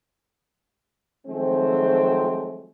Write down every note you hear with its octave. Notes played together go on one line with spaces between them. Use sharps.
D#3 F3 F#3 G#3 A3 C4